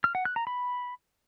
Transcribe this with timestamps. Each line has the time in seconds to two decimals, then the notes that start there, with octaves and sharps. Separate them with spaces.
0.04 F6
0.15 F#5
0.25 F#6
0.36 A#5
0.47 B5